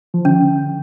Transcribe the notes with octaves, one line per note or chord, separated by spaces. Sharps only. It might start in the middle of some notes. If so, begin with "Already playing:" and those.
F3
D3 C#4